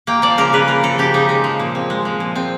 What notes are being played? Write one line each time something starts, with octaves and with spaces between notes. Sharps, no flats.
A#3 G5
F3 D5
C#3 A#4
C#3 B4
A#3 A#4
F3 A4
C#3 G4
C#3 D#4
G#3 D#4
F3
A#2
C4
G#3
F3
A#2
C4